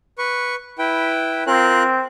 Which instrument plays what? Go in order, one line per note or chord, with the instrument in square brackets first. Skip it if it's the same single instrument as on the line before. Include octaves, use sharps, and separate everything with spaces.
[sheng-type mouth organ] B4 C#6
E4 B4 G5
[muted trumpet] C4 [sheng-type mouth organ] F4 A#4 F#6